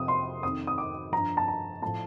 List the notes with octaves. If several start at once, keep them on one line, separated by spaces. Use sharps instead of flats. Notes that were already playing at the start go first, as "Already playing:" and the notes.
Already playing: F2 C3 F3 D#6
C6
F2 D#3 D#6
D#6
D6
G2 F3 A#5
A5
A#5
A2 F3 A5